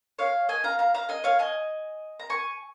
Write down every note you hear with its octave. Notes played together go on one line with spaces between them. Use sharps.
C#5 F5
D#5 G#5
F5 A#5
F5 A#5
F5 A#5
D#5 G#5
C#5 F5
D#5 G#5
A#5
G#5 C#6